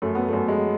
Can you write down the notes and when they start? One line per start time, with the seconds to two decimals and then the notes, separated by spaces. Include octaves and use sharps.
0.02 F#2 A3
0.15 B3
0.28 F#2 A3
0.48 G#3